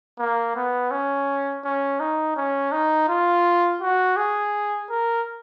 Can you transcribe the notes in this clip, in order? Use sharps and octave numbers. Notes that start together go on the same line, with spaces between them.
A#3
B3
C#4
C#4
D#4
C#4
D#4
F4
F#4
G#4
A#4